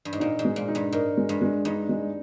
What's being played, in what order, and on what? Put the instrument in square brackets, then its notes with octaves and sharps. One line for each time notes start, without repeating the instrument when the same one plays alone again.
[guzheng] G2
G#2
[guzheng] A#2 [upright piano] D#4
[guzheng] G#2
[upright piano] G#3
[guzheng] A#2
[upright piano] D#4
[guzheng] G2
[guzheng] G#2 [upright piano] A#4
[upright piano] G#3
[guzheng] G2
[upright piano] G#3
[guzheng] G2 [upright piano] D#4
[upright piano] G#3